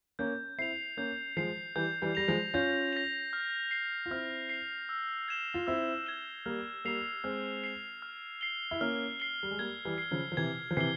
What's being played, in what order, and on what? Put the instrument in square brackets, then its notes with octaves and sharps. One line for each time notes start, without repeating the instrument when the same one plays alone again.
[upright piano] A#3 C#4 [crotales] G6
[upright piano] C4 E4 [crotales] C7 F7
[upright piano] A#3 C#4 [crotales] G6
[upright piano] F3 G#3 [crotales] C7 F7
[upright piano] E3 G3 [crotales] G6
[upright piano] E3 G3
[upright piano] G3 [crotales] A#6 F7
[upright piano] F3 G#3
[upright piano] C#4 F4 [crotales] G6
[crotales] A#6 F7
F6
C7 F7
[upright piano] F4
[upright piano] C4 E4 [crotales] F6
[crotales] C7 F7
E6
G#6 E7 G7
[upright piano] F4
[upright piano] C4 E4 [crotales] E6
[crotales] G#6 E7 G7
[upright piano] G3 A#3 [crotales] F6
[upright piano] G3 A#3 [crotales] C7 F7
[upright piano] G#3 C4 [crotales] F6
[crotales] C7 F7
F6
C7 G7
[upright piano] E4
[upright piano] A#3 C#4 [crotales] F6
[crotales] C7 G7
[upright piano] G3
G#3
[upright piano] G3 A#3 [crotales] G#6
[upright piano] E3 G3
[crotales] C7 G7
[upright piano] C#3 F3
F3
[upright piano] C3 E3 [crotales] G#6
[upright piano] F3
[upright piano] C3 E3 [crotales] C7 G7